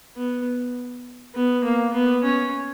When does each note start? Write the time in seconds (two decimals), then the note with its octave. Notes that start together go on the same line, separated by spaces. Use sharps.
0.17 B3
1.35 B3
1.65 A#3
1.94 B3
2.24 C#4